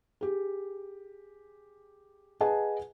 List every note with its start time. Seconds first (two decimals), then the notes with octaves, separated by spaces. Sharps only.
0.21 G4 G#4
2.41 G#4 B4 D#5 F#5 G#5 A5